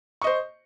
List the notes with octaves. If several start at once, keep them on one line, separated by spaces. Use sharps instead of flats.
C5 D#5 C#6